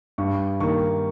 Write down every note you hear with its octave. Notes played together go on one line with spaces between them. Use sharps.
G2 C#6
D#3 A#3 C#6